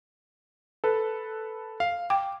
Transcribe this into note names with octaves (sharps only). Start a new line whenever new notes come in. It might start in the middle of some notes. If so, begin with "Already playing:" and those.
A4 B4
F5
G5 D6